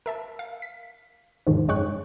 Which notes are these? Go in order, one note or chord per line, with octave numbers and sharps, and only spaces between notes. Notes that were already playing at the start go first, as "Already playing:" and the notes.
A#4 E5 A5
F5
B6
E2 G#2 B2 D3 D#3 F3
F#2 G#3 C#5 G5 C#6 F#6